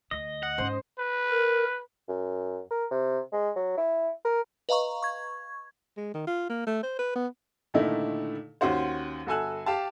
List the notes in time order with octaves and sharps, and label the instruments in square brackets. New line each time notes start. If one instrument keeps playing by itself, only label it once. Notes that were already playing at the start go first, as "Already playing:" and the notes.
[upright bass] D2 [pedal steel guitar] D#5
[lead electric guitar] F#5
[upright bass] G#2 C#4 [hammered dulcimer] C5
[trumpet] B4
[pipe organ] A#4
[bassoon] F#2
A#4
C3
G#3
F#3
E4
A#4
[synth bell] B4 D#5 F5 A#5 C#6
C#6 G#6
[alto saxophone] G#3
D#3
F4
A#3
A3
C5
B4
B3
[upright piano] A#2 D3 D#3 A3 D#4 E4
D#2 C#4 F#4 C5
G1 F#4 A4 G#5 E6 F#6
G4 F5 A5